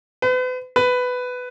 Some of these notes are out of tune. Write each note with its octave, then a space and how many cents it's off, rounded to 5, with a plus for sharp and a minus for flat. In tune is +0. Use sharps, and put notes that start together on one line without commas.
B4 +40
B4 +10